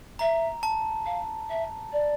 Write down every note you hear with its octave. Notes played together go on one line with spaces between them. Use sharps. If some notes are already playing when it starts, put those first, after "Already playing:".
E5 A#5
A5
F5
E5
D5